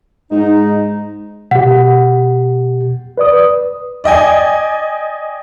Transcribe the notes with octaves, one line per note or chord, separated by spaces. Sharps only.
G#2 D#4
B2 G4 F#5
B4 D5 D#6
D5 D#5 G5 G#5